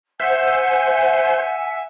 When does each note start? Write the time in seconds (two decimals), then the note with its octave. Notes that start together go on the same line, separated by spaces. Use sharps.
0.20 C5 E5 F#5 G#5